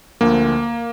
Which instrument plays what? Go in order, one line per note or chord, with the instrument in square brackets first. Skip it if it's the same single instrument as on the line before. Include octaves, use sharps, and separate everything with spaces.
[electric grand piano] D2 D3 F3 A#3